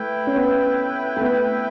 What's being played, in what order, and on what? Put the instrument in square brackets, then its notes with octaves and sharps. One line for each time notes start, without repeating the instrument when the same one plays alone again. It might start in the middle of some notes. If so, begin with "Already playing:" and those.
Already playing: [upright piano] A3 [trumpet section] E4 B4 E5 G5
[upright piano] C#4
B3
A3
B3